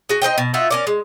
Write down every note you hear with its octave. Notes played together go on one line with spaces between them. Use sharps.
F#4 G#4
D#4 C5 D#5 G5
B2
D#4 F4 F#4 E5
C#4 A#4 D5
G#3